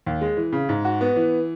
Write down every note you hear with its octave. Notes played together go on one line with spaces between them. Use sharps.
D#2
G#3
E3
C#3
G#2
F#4
B3
E3